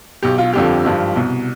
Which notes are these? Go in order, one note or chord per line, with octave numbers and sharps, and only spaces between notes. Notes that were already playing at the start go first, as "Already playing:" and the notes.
B1 B2 G4
F4
G1 F2 D3 F3 G4
G#1 G2 F3
C2 B2